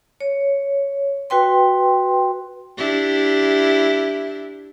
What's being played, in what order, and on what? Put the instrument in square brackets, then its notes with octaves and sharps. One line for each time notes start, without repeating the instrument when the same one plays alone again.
[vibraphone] C#5
F#4 B4 G5 C6
[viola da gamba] D4 E4 G4